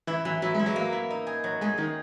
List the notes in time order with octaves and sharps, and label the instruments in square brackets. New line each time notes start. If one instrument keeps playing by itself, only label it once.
[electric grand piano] E3 [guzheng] E4
[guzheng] E3 [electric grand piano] F#3
[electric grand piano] F#3 [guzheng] E4
[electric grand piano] G#3 [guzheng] E4
[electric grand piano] F#3
[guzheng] A#3
E4
D#4
G#4
F#3
[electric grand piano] G#3 [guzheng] G#4
[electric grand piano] D#3 [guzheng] D#4